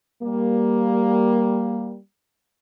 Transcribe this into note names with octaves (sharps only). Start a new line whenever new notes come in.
G3 A#3